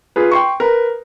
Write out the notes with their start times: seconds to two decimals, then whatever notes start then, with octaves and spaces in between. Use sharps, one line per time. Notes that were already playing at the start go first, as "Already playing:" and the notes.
0.16 F4 G#4 B4
0.31 G5 C6 C#6
0.60 A#4 B4